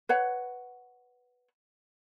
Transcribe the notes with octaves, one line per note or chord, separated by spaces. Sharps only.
B4 C#5 F#5